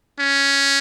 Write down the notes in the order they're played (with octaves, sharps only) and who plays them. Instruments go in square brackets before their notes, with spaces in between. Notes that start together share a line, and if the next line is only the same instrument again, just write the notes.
[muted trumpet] C#4